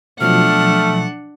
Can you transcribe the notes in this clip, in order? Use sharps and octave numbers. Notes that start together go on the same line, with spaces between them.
B2 F3 F#3 A3 D4 F#5 F6